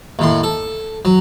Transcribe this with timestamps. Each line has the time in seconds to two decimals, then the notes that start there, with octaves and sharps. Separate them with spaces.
0.19 D#2 A2 C6
0.43 A4
1.05 F#3